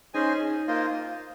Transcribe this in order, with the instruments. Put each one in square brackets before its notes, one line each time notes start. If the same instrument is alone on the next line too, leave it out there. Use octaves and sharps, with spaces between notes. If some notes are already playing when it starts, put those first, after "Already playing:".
[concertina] C#4 G#4 C5 D#5 G#5 [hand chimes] D#4
[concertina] A#3 F4 C5 D#5